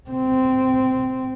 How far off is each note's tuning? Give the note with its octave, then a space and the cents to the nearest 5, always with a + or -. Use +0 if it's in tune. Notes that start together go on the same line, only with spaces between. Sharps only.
C4 -15